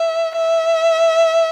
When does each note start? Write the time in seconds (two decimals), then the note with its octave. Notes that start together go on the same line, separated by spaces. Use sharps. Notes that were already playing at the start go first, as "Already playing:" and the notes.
Already playing: E5
0.36 E5